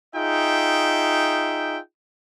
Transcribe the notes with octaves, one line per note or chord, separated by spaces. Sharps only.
D#4 F4 G#4 E5 G5